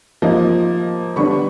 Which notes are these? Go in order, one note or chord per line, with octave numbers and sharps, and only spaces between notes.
F3 A#3 D#4
D3 G3 B3 D4 B5 C#6